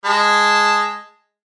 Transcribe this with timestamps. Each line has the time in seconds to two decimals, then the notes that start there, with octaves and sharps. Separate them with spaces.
0.05 G#3 A5